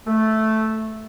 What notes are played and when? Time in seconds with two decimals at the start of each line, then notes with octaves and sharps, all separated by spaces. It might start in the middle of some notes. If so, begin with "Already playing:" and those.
0.07 A3